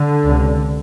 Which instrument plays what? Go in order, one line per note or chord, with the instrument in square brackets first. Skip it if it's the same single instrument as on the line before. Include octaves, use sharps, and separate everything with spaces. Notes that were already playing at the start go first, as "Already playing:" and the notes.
Already playing: [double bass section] D3
C#2 C3